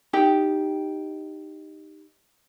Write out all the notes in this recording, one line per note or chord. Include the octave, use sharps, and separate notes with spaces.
D#4 G4 G5